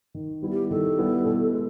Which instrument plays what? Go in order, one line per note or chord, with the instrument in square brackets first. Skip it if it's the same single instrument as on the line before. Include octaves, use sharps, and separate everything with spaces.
[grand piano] D#3
G3 B3 E4
[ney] G4
[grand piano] D#3 [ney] A4
[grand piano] G3 B3 E4
B2
G#3